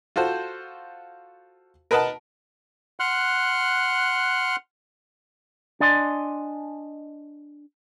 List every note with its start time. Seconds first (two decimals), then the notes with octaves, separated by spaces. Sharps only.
0.16 F4 F#4 A4 C5
1.91 A#4 B4 D#5 F#5 A5
3.00 F#5 C6 F6 F#6
5.80 D4 D5 D#5 G#5 C6